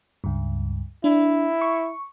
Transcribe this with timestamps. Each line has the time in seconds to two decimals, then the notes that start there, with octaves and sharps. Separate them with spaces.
0.24 C#2 G2
1.04 D4 E4
1.61 C#6